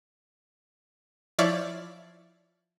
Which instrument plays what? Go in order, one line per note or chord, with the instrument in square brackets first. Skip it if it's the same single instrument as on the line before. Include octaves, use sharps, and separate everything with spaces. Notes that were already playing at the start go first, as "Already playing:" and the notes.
[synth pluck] F3 E4 C#5 D5 F5